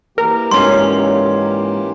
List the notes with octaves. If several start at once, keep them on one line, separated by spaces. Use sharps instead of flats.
E3 A#3 G4 A#4
G#2 C#4 F4 C6